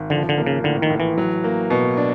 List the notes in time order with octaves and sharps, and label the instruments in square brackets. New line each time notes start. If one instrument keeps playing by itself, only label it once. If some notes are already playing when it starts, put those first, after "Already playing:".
Already playing: [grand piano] G#1
[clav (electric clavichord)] D3 [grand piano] F3
[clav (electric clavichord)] D3
[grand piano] A#3
[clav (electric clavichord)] C#3
[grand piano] A2 [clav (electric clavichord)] D3
[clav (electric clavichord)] D#3
[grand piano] A2
[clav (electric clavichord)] E3
[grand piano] F#3
A#3
B2
D4